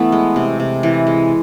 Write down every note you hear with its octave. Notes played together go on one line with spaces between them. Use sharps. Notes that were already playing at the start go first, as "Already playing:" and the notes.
Already playing: E3 A3 B3
G#3
C3
C3
E3
G#3